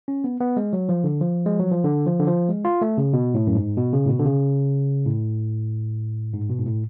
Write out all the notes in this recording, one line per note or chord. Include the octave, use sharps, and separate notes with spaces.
C#4
B3
B3
G#3
F#3
F3
D3
F3
G#3
F#3
F3
D3
F3
D3
F3
G#3
F4
A3
C#3
B2
A2
F#2
G#2
B2
C#3
A2
B2
D3
C#3
A2
G#2
B2
G#2
A2